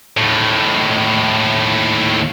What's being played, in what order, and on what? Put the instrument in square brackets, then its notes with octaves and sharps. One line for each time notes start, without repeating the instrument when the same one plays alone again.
[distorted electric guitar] D#2 A2